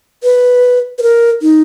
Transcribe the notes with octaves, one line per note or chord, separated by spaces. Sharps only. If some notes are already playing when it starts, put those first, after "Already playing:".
B4
B4
A#4
D#4